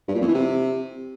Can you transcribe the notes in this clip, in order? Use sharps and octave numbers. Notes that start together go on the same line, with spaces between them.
G2
A#2
F2
E3
C3